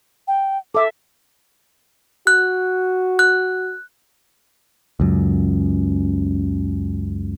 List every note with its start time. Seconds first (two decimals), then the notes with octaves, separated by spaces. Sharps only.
0.28 G5
0.75 A4 E5 D6
2.27 F#4 F#6
3.19 F#6
5.00 C#2 F#2